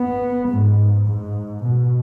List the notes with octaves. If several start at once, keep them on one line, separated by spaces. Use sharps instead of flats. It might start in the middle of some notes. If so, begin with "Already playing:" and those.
Already playing: B3
G#2
G#2
B2